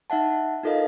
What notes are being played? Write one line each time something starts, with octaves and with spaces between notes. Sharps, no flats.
D#4 E5 F#5 A5
D#4 F4 A4 A#4 D#5 F5